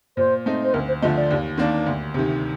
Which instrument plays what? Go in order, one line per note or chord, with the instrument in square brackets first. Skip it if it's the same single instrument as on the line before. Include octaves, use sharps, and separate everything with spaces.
[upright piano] A#2 [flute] C5
[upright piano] A3 C4 D#4
[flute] C5
[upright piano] D2 [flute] A#4
[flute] C5
[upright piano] D3 F3 A3 [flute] D#5
[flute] D5
[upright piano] D#2
D#3 A#3 D4
D2
C3 D#3